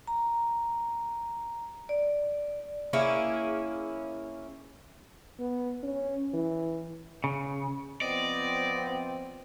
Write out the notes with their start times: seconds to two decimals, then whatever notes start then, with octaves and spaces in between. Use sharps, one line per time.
0.07 A#5
1.89 D5
2.93 A#3 C#4 E4 G#4
5.39 B3
5.83 C#4
6.34 E3
7.24 C#3
8.02 F3 B3 C4 D5 D#5